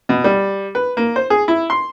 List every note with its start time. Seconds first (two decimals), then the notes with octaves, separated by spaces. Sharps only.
0.09 B2
0.24 G3
0.75 B4
0.97 A#3
1.16 C5
1.30 G#4
1.48 E4
1.70 C6